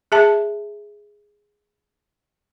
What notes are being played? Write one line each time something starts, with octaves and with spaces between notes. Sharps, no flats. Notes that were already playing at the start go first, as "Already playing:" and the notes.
G#4 E5 A5